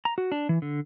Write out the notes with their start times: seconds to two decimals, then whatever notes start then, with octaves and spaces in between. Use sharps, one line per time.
0.05 A#5
0.18 F#4
0.32 D4
0.49 E3
0.62 D3